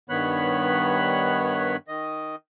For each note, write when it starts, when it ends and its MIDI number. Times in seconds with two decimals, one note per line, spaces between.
0.09 1.76 43
0.09 1.76 51
0.09 1.76 59
0.09 1.76 73
0.09 1.76 83
0.09 1.76 90
1.88 2.36 51
1.88 2.36 75